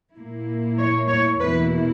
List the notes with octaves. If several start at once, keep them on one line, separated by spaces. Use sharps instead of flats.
A#2 A#3 E4
C#5
C#5
E2 B2 A#3 E4 B4